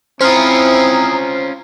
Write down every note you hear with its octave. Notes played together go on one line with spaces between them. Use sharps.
C4 C#4 E4 F4 C5 A#5 D#6 F6